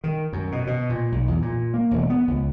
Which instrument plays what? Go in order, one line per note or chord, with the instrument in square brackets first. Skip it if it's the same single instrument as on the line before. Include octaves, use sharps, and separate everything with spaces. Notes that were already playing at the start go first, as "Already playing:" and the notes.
[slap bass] D#3
F#2
B2
B2
A#2
B1
E2
A#2
A#3
E1
B3
C#2